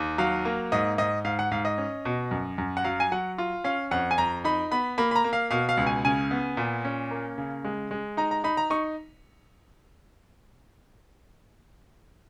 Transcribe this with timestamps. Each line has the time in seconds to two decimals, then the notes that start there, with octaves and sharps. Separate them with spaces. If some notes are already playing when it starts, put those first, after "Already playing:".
Already playing: D#2
0.18 F#3 F5
0.45 A#3
0.72 G#2 D#5
0.98 G#2 D#5
1.25 G#2 F5
1.39 F#5
1.51 G#2 F5
1.65 D#5
1.78 C#4
2.05 B2
2.31 F#2
2.58 F#2
2.77 F#5
2.84 F#3 F5
3.00 G#5
3.12 F#3 F#5
3.38 F4
3.64 C#4 F5
3.91 F2 F#5
4.11 G#5
4.18 F2 A#5
4.44 D#4 B5
4.71 B3 B5
4.98 A#3 B5
5.11 B5
5.16 A#5
5.24 A#3
5.33 F5
5.51 B2 F5
5.69 F5
5.77 C#2
5.87 G#5
6.05 C#3 G#5
6.31 B3
6.57 A#2
6.85 C#4
7.11 A#3
7.38 C#3
7.65 G#3
7.91 G#3
8.17 D#4 A#5
8.31 A#5
8.44 D#4 B5
8.57 A#5
8.70 D#4 C#6